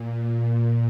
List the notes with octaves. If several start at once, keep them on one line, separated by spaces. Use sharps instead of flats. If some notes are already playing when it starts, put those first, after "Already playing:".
Already playing: A#2